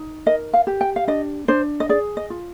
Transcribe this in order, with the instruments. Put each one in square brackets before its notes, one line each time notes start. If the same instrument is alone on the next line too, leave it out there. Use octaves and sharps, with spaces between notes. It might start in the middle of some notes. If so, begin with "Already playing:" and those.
Already playing: [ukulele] D#4
A#4 D#5
F5
G4
G5
F5
D4 D#5
D4 C5
D#5
G#4 D5
D#5
F4